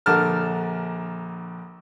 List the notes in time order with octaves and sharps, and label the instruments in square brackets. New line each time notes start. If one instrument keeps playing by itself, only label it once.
[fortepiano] A#1 D3 A#4 A5 F6